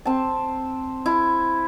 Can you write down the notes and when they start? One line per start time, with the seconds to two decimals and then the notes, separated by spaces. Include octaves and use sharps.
0.05 C4 A5
1.06 E4